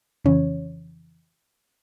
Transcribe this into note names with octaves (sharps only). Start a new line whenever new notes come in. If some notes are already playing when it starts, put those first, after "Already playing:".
F2 C#3 E3 C#4 C#5